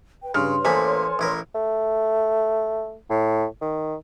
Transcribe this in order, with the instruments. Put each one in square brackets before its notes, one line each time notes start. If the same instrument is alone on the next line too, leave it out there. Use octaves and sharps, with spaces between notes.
[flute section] B4 G5
[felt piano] G2 F6 [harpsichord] C#3 [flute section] B4 C#5 C6
[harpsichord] A1 A#3 B5 [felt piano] A4 C5 G#5
[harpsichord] A1 E4 A#4
[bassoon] A3
A2
D#3